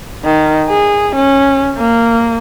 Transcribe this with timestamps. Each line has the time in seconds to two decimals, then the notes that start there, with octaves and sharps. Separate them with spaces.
0.25 D#3
0.69 G#4
1.16 C#4
1.78 A#3